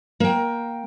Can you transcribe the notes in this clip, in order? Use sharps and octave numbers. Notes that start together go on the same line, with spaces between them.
A#3 G5